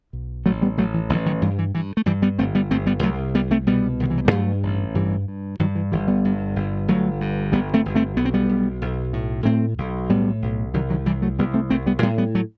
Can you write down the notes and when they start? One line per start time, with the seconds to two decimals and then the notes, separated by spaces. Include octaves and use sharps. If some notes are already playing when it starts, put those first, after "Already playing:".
0.13 B1
0.46 A1 F#3 A3
0.62 G3 B3
0.77 A1 F#3 A3
0.94 E3
1.09 A1 D#3 F#3
1.26 D#3 F#3
1.42 G2 E3 G3
1.59 E3
1.75 G2 E3
1.97 A3
2.06 G2 E3 G3
2.22 G3 B3
2.39 G1 A3 C4
2.55 G3 B3
2.71 G1 A3 C4
2.87 G3 B3
3.03 C2 F#3 A3
3.35 C2 G3 B3
3.51 A3 C4
3.67 B2 G3 B3
4.00 C2 D#3
4.10 E3
4.18 F#3
4.25 G3
4.31 G2 F#3 A3
4.63 A1
4.95 G2 E3 G3
5.28 G2
5.59 G2 D#3 F#3
5.75 E3
5.92 G1 E3 G3
6.08 G3 B3
6.25 G2
6.56 G1
6.88 G1 F#3 A3
7.21 G2
7.52 G1 G3 B3
7.74 A3 C4
7.85 G1
7.95 A3 C4
8.17 B1 B3
8.25 C4
8.34 G3 B3
8.49 B1
8.82 B1
9.13 A2
9.45 A2 A3 C4
9.78 B1
10.10 A2 G3 B3
10.42 B1
10.74 C2 D#3 F#3
10.90 D#3 F#3
11.06 C2 E3 G3
11.22 F#3 A3
11.39 C2 G3 B3
11.54 A3 C4
11.70 C2 A3 C4
11.86 G3 B3
12.02 A2 G3 B3
12.18 G3 B3
12.35 F#3 A3